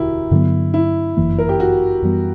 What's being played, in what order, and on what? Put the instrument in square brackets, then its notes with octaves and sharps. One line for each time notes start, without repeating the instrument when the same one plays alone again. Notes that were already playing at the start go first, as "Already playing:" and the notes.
Already playing: [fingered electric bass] E1 D2 [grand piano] E4 F#4 G4 A#4
[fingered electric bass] G2 D3 F#3 B3
[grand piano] E4
[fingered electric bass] G1 F#2 E3 A#3
[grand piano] A#4
G4
F#4
[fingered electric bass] F#2 E3 G3 B3